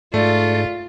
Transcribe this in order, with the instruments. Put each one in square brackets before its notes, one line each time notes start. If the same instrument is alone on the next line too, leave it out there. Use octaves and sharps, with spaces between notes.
[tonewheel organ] G#2 [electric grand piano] A3 [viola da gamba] F4 [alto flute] D5